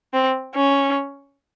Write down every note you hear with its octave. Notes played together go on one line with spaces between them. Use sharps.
C4
C#4